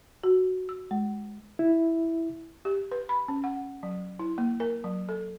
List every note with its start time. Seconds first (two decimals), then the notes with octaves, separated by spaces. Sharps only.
0.24 F#4
0.69 E6
0.91 G#3
1.59 E4
2.65 G4
2.91 B4
3.09 B5
3.28 C#4
3.44 F#5
3.83 F#3
4.19 E4
4.38 A#3
4.60 A#4
4.84 F#3
5.09 A4